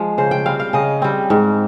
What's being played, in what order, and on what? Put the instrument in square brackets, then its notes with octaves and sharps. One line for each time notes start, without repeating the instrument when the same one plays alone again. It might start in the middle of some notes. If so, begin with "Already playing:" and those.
Already playing: [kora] F3 G#3 F5
C#3 C5
G5
G3 C4 F5
F5
C#3 D#5
G3 C4
G#2